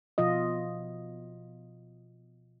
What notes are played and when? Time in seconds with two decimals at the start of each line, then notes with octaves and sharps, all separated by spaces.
0.18 B2 F3 F4 D#5